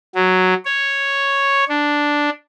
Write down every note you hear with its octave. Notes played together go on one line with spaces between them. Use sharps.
F#3
C#5
D4